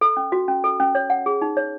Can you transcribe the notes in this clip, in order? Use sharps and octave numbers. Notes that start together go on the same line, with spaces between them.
A4
C#4
F#4
C#4
A4
C#4
C#5
F#5
G#4
D#4
C#5